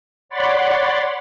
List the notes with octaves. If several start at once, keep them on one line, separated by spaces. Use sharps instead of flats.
C#5 D5 F#5 B5 C6 A6